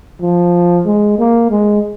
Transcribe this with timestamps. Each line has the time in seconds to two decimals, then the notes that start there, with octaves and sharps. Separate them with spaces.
0.21 F3
0.86 G#3
1.18 A#3
1.50 G#3